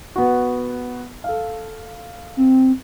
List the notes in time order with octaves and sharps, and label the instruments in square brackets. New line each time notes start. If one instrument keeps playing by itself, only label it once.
[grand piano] B3 F#4
A4 F5
[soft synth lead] C4